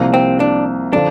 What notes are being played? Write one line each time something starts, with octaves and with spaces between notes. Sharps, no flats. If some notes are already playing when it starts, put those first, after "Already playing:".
Already playing: C2 C3 F3 A#3
C4
D4
D3 F3 D4